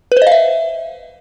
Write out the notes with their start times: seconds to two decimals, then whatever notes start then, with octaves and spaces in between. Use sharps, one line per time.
0.12 B4
0.17 C5
0.22 D#5
0.27 F5
0.32 E5